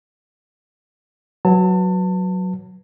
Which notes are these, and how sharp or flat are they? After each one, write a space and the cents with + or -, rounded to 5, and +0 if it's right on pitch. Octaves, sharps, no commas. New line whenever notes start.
F#3 +0 B4 +0 A5 +30